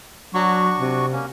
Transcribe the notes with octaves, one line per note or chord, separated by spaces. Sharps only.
F#3 D4 F#4 C#6
C3
A#3 C#4